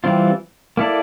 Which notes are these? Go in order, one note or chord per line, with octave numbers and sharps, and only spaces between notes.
E3 G3 C4 F4
A#3 E4 A4 D5